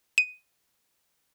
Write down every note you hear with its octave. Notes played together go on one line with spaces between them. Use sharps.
D#7